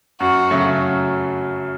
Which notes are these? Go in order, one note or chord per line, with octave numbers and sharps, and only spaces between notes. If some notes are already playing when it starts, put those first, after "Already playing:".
F#2 F#4
C#3 F#3 A3